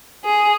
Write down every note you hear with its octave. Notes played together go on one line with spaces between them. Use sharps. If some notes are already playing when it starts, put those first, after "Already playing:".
G#4